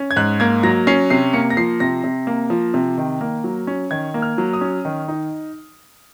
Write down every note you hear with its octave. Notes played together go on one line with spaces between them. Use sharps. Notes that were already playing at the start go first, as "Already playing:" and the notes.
Already playing: C#4
G#6
G#2 F#6
A#3 G#6
F#3 A#6
C#4 C7
C3 C7
A#3 C#7
A#6
F3 C7
C3 A#6
C3
A#3
F3
C3
D#3
A#3
F#3
C#4
D#3 G#6
A#3
F6
F#3
D#6
C#4
D#3
D#4